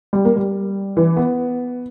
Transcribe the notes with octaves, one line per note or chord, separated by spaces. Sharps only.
G3
A#3
G3
E3
B3